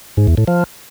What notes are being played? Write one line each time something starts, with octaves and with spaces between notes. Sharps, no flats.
G#2
E2
A2
F3